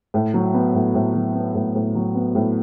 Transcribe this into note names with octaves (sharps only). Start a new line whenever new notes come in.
A2
F#3
B3
A2
A2
F#3
B3
A2
A2
F#3
B3
A2